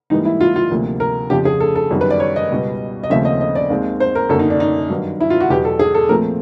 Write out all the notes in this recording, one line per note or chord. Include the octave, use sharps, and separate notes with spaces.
G#2 E3 G3 A#3 D#4
E4
F4
F4
D2 C3 F3 A#3
A#4
F2 C#3 F3 G4
G#4
A4
A4
F#2 D#3 G3 B3
B4
D5
C#5
D#5
C#2 B2 G3 B3
D#5
D#2 C#3 F3 A3 C4 E5
D#5
D#5
D5
D#2 D#3 G#3 C4
C5
A#4
F#2 D3 F#3 A#3 A4
D#4
D4
D#4
G2 D#3 F#3
E4
F4
F#4
E2 B2 F#3 G4
A4
G#4
A4
A#2 F3 A3 C4 A#4